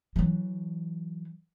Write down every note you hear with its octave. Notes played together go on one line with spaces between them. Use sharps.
E3 F#3